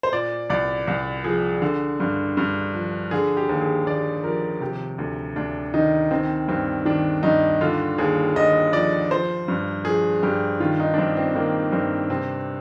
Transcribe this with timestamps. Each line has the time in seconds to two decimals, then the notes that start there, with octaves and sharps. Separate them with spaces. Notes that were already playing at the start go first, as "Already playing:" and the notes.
0.03 C5
0.12 A#2 D5
0.50 C2 D5
0.87 C2
1.24 F3 G#4
1.62 D3
2.00 G2
2.37 G2
2.75 F3
3.11 D3 G#4
3.37 G4
3.49 D#2
3.61 G#4
3.86 D#2 D5
4.24 F3 A#4
4.61 C3 G4
4.98 D2
5.36 D2 D4
5.74 D#3 D#4
6.11 D#3 C4
6.48 G2 C4
6.85 D#3 D4
7.23 G2 D#4
7.61 D3 F4
7.98 D#2 G#4
8.36 D#2 D#5
8.73 F3 D5
9.10 F3 C5
9.48 G2
9.85 F3 G#4
10.23 G2 G4
10.60 D#3 F4
10.80 D#4
10.94 D4
10.98 G2 C4
11.17 C4
11.35 D#3 A#3
11.72 G2 C4
12.10 C3 C4